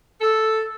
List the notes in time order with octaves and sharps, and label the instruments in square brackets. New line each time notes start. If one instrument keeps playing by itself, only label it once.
[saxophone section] A4